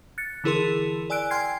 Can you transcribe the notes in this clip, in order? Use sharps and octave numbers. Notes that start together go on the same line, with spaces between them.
F#6 A6 C#7
D3 E3 E4 G#4 A#4 C6
D5 G#5 E6 F#6 D7
G5 G#5 C6 F6 G#6 C7